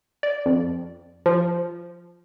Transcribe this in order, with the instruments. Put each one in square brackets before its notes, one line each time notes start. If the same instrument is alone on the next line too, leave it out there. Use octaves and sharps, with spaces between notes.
[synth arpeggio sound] D5
F2
F3